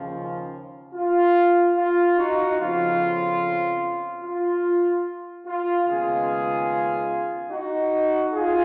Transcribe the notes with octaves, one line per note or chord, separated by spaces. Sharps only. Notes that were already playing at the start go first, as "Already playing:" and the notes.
Already playing: D#2 C#3 F3
F4
F4
D#4 F#4
F2 C#3 F3 B3 F4
F4
F4
D#2 C#3 G#3 B3 F4 G#4
D#4 F#4
F4 G#4